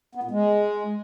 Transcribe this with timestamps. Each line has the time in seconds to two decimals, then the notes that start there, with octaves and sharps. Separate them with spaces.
0.15 B3
0.23 A#2
0.31 G#3